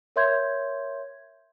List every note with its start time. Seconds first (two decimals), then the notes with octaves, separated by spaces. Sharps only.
0.16 A#4 C#5 E5 C6 G6 G#6